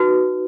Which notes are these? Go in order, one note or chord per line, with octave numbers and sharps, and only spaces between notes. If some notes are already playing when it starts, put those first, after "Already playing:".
Already playing: D#4 F#4 B4